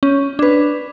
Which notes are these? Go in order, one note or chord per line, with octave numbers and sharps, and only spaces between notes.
C#4
D4 B4